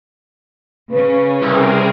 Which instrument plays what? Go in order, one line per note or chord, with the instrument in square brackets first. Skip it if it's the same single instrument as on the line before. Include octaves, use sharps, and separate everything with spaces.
[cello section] C#3 C#4 [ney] B4
[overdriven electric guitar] C2 [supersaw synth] C4 G#4 A#4